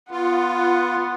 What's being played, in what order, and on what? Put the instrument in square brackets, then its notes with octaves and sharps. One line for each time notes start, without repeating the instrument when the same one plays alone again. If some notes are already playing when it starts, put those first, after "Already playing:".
[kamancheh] B3 F#5 [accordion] F4